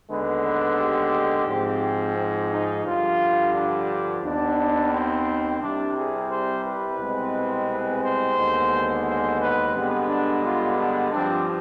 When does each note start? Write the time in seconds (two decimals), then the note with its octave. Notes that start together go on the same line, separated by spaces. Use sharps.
0.09 D#2 D3 G#3 B3 B4
0.44 B4
0.78 G4
1.47 G#2 F3 C4
2.16 C4
2.51 D#4
2.86 G2 D3 F3 F4
3.54 D4
4.23 D#2 D#3 B3 D4
4.91 C4
5.61 C2 C3 G3 D4
5.95 G#4
6.30 C5
6.64 B4
6.98 C2 B2 G#3 C4
7.68 B4
8.02 C5
8.37 D#2 D3 G#3 B3
9.05 C5
9.40 B4
9.74 G2 D3 G#3 B3 C4
10.08 D4
10.44 F4
10.77 D4
11.12 G2 F3 C4 D4